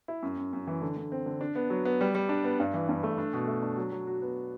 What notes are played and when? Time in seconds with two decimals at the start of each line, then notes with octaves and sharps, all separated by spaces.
0.08 E4
0.23 F#2
0.37 F#2
0.53 F#2
0.67 E3
0.81 D3
0.97 D3
1.12 C4
1.26 D3
1.41 D4
1.55 B3
1.70 F#3
1.85 B3
2.01 G3
2.15 G3
2.29 D4
2.44 B3
2.60 G2
2.74 E3
2.89 G2
3.03 A3
3.18 D4
3.33 B2
3.47 A3
3.63 D4
3.77 F#3
3.92 F#3
4.07 F#4
4.22 B3